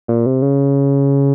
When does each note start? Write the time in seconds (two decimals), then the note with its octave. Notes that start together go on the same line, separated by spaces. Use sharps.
0.08 A#2
0.26 C3
0.42 C#3